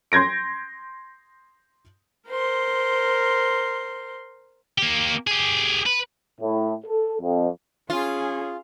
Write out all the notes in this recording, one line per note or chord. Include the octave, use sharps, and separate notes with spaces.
C6 G6 G#6 A#6 D7
A#4 C5 C6
A#3 G4
G4 G#4
B4
A2
A4
F2
C#4 F4 G#4